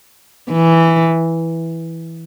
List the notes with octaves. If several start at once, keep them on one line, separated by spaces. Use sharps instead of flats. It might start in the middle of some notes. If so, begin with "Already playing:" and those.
E3